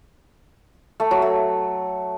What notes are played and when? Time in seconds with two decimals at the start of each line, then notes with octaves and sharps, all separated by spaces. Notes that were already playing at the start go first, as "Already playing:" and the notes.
1.00 A3
1.11 F#3
1.22 A3